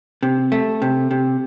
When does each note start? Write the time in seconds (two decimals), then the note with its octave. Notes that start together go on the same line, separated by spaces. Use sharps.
0.23 C3
0.52 A3
0.82 C3
1.11 C3